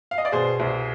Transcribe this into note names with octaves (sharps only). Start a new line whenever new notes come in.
F5
D#5
D5
B2 G#4 C5
C2